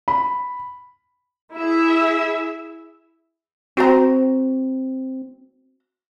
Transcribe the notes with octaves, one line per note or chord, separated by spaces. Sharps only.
B5
E4 G#4 E5
C4 F#4 C5 A#5